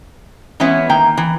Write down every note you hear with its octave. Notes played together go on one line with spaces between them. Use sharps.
E3 G#3 B3 C#4 E4
D#3 A#3 G5
E3